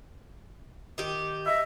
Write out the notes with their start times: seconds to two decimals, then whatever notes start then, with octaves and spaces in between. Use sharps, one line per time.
0.98 D#3 G4
1.46 D#5 E5